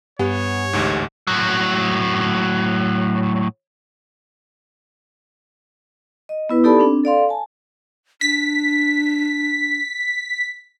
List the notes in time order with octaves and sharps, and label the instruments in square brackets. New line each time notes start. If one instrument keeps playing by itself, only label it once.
[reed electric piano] G2 [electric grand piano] B3 [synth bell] G4 F#5 G#5 [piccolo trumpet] C#5
[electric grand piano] A1 D2 G#2
[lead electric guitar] A2 F#3
[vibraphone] D#5
B3 E4 B4
D#4 G4 A4 D5 A5 B5
C4 D4
A4 D5 F5 C6
G#5 A5
[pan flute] D4 [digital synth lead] B6